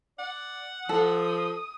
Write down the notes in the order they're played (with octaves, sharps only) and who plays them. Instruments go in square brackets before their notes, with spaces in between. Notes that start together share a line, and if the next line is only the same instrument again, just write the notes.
[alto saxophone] D5 [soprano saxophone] F#5
[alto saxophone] F3 [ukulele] A4 [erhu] D#6